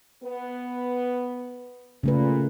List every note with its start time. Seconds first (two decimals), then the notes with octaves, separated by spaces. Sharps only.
0.24 B3 B4
2.03 A#2 C#3 A3 B4